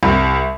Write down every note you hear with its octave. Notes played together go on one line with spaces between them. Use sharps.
C2